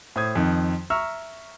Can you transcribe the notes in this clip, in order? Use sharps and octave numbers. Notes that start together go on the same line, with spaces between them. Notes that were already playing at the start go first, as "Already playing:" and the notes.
A2 C5 D#6 G#6
F2 D#3
E5 A#5 C#6 E6 F6